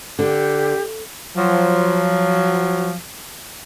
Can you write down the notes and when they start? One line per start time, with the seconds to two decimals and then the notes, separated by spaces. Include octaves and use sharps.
0.19 D3 G4
1.37 F3 F#3